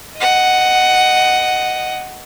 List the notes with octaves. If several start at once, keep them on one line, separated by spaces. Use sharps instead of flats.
D#5 F#5